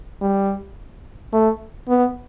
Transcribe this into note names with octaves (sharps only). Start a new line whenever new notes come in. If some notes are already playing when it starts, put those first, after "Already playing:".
G3
A3
B3